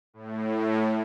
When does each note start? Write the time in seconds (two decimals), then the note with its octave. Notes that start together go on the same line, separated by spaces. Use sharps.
0.14 A2